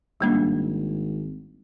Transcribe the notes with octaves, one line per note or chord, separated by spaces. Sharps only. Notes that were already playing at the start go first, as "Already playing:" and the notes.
G#1 G3 A#3 D4